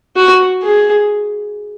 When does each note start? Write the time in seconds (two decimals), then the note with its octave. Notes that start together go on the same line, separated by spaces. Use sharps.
0.16 F#4
0.63 G#4